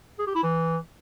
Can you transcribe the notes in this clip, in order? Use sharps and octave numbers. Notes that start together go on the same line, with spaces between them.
G#4
G4
E4
E3